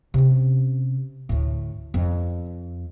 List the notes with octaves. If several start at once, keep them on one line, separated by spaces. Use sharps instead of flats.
C3 C#4
D2 A2
F2